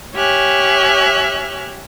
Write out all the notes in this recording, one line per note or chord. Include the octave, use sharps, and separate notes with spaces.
G4 C#5 E5 G#5 F6 F#6